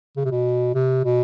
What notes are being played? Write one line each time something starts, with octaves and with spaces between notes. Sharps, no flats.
C#3
C3
B2
C3
B2